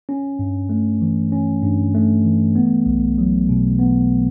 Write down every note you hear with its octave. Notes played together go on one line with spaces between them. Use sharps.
C#4
G2
A3
E3
C#4
G2
A3
E3
B3
B1
F#3
B2
B3